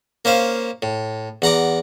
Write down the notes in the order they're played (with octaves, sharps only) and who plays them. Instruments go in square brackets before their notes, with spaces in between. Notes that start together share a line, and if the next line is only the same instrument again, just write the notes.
[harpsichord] A#3 C#4 C5 F5
A2
E2 F#5 A#5 D6